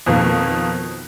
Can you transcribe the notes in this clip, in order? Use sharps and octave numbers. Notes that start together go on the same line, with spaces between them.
F2 B2 D#3 A#3